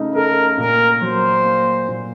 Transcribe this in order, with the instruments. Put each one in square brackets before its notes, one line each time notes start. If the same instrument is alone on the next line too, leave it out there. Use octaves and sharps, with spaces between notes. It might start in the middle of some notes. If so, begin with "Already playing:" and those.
Already playing: [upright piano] C#3 A3 D#4
[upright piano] A4 [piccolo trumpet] A#4
[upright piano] A#2 [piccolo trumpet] A#4
[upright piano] F#3 [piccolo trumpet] C5
[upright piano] A#3
A#2